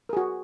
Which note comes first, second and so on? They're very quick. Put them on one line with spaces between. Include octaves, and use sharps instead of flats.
A#4 G#4 F#4